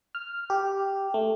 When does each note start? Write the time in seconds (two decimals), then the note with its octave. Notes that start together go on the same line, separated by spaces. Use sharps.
0.15 F6
0.50 G4
1.14 A3